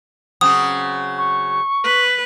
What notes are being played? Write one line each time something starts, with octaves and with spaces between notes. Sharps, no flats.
C#3 F#3 C4 D#6
C#6
B4